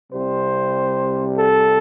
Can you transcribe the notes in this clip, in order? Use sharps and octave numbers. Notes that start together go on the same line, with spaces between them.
C2 C3 G3 C5
A4